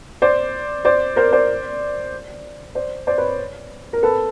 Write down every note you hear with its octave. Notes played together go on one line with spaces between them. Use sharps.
C5 D5
C5 D5
A#4 C5
C5 D5
C5 D5
C5 D5
B4 C#5
A#4
A4 B4